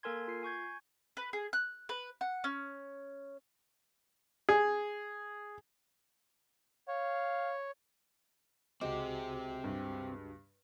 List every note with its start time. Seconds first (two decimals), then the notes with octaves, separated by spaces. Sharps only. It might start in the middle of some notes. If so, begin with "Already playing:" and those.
0.03 A#3 A4 A#4 G#5 C6 G#6
0.28 F4 C7
0.43 G#5 C#6 G6 G#6
1.17 B4
1.33 G#4
1.53 F#6
1.89 B4
2.21 F#5
2.44 C#4
4.49 G#4
6.88 C#5 F5
8.81 C#2 G#3 C4 F#4 G4 D6
9.64 G2